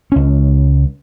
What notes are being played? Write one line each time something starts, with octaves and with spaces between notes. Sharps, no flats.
C#2 C#4